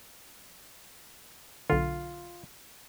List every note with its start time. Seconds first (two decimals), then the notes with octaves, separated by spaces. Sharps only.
1.70 B1 D3 F4